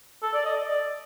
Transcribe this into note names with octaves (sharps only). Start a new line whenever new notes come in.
A4
D5
D#5
D5